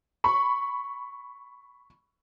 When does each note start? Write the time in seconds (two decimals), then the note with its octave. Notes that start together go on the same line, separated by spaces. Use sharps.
0.24 B5 C#6